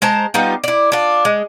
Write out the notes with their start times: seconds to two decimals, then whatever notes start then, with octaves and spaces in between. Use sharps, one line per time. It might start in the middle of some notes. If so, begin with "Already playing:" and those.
0.02 G#3 C5 A5 A#5
0.34 G3 B3 D#4 F4
0.64 E4 D5
0.92 D4 F4
1.25 G#3